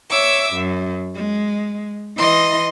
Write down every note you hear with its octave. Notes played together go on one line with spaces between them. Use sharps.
C#5 E5 D6 E6
F#2
G#3
E3 D#5 C6 A#6